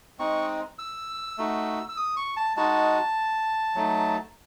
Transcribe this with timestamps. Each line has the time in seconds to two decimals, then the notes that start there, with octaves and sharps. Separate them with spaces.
0.19 G#3 C4 D#4 C#6
0.79 E6
1.38 A3 D#4 F#4
1.89 E6
1.97 D#6
2.17 C#6
2.37 A5
2.57 G#3 D#4 F#4 A5
3.75 F#3 A3 D#4